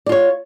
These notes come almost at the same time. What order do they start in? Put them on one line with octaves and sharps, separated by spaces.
D5 F4 C#5